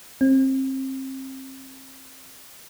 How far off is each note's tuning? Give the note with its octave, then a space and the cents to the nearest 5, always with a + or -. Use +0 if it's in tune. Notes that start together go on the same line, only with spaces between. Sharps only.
C4 +30